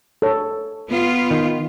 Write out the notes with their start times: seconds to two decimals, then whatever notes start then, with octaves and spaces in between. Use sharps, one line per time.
0.22 A4 C#5
0.88 B3 F4
1.31 D#3